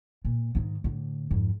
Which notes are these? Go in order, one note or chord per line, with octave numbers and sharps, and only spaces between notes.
A#2
G#2 D#3
A2 D3
F2 G#2